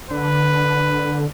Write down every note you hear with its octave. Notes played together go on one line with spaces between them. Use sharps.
D3 B4